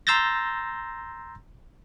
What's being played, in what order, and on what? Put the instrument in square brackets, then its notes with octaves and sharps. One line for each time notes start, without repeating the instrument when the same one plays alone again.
[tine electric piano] A#5 C6 E6 G6 A6 A#6